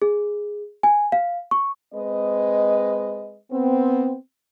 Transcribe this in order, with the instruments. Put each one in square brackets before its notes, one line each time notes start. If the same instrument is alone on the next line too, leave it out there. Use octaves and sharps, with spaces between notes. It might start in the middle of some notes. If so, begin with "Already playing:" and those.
[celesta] G#4
G#5
F5
C#6
[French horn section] G#3 C4 B4 D#5
B3 C4